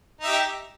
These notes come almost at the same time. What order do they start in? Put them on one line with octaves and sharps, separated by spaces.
D#4 E5 G4